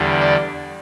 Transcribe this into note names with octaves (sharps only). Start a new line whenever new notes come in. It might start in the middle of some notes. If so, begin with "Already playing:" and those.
Already playing: E2 D3 G3
D5